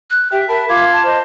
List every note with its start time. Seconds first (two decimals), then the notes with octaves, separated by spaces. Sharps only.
0.10 F#6
0.32 G4 E5 G5
0.49 A#4 A5 B5
0.69 F4 F5 C6 D6 G#6
0.93 A5
1.04 C5 D#5